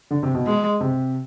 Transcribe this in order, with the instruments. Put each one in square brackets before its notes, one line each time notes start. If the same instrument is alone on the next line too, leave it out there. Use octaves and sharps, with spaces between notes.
[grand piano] D3
C3
B2
[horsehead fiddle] G#3
[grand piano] C3